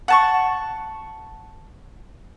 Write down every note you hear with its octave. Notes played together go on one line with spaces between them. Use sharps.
F#5 A5 C#6